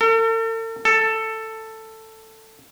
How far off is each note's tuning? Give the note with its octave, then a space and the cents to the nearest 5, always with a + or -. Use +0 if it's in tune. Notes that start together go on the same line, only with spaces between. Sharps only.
A4 +45
A4 +10